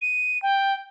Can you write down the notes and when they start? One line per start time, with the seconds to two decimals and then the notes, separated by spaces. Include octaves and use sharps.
0.02 D#7
0.43 G5